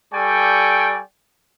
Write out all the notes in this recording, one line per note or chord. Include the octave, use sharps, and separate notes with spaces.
G3 A4 D5 G5 G#5 C#6